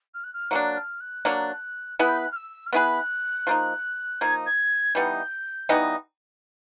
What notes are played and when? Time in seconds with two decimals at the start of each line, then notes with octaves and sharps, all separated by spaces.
0.14 F6
0.24 F#6
0.33 F6
0.50 F#3 A#3 D4 F#6
0.76 F6
1.00 F#6
1.25 F#3 A#3 D4
1.99 B3 E4 G#4 B4 F#6
2.08 G6
2.17 F#6
2.32 F6
2.36 E6
2.66 F6
2.73 B3 E4 G#4 B4 F#6
3.47 F3 A#3 D#4
4.21 F3 A#3 D#4 G#6
4.46 G#6
4.95 E3 G3 B3 D#4 G6
5.69 E3 G3 B3 D#4